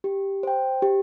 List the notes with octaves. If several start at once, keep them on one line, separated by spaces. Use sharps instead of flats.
G4
C5 G5
G4